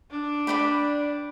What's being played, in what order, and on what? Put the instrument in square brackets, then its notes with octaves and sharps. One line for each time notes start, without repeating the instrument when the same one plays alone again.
[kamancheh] D4
[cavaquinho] B4 D5 G5 B5